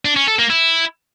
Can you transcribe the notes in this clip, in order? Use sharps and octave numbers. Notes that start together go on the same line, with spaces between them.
D4
C#4
A4
A#3
E4